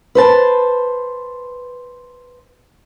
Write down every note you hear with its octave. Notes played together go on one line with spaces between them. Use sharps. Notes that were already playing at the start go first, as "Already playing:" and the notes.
B4 C5 A5